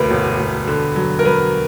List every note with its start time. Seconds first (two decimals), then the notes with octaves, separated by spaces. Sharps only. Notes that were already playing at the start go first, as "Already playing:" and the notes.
Already playing: E1 D2 A#4 B4
0.11 E1
0.40 E1
0.67 D3
0.96 F#3
1.19 A#4
1.25 F#3 B4